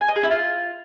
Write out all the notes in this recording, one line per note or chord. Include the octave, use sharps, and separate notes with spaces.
G#5
D#5
G#4
E4
F4